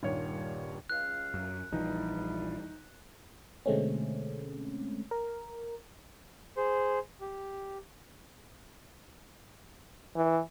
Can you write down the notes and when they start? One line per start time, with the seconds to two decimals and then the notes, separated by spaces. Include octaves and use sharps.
0.03 D#1 G2 D#3 C#5
0.90 C#2 F5 F#6
1.34 F#2
1.72 A#1 E2 E3 F3 G3 D#4
3.66 B2 D3 G#3 A3 C4 C#4
5.11 A#4
6.57 G#4 C5
7.21 G4
10.16 E3